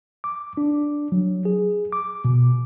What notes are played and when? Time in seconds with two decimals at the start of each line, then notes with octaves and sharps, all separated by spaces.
0.24 D6
0.57 D4
1.12 F#3
1.45 G#4
1.93 D6
2.25 B2